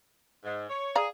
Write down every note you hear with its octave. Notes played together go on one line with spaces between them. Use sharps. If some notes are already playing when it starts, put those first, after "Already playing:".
G#2
C#5
G#4 D5 F5 A#5